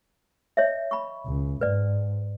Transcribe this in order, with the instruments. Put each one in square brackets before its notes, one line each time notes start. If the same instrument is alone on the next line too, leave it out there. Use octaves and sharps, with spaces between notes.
[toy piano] C#5 D#5 E5
B5 C#6
[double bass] C#2
[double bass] G#2 [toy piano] B4 D5